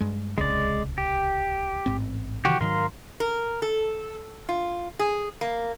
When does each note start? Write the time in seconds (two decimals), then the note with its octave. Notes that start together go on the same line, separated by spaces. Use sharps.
0.01 G2 G#3
0.38 D1 C2 C#3 G#3 D5
0.98 G4
1.86 A1 G#2 C4
2.45 C3 D#3 E3 F#4 G4
2.61 G#2 D#3 F#3 A#4 F5 C6
3.20 A#4
3.62 A4
4.49 F4
4.99 G#4
5.41 A#3